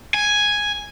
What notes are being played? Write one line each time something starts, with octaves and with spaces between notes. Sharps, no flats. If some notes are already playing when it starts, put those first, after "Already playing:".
G#5